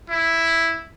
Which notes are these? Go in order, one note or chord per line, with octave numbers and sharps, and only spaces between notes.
E4